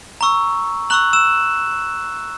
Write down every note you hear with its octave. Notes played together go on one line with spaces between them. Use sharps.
A#5 C#6 E6
A#5 C#6 E6 F#6 F#7
E6 E7